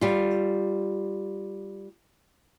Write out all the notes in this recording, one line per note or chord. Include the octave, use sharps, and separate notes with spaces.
G3 F4